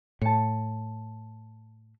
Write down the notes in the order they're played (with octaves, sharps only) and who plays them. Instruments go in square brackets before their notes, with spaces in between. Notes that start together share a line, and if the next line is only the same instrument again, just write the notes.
[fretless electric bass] A2 [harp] A5 C#7